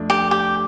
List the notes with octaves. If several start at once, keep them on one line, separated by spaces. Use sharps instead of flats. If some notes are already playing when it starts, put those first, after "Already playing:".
Already playing: F2 A3 D4
G4
G4